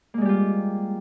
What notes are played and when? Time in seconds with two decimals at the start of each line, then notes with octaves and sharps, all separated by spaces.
0.14 A#3
0.18 G#3
0.21 G3
0.25 G4
0.29 F4